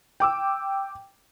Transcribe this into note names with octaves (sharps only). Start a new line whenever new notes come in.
G5 D6 E6